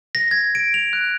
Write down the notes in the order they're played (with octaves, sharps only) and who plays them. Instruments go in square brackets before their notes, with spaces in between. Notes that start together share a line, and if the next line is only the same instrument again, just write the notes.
[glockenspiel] A#6
G#6
D7
F7
F#6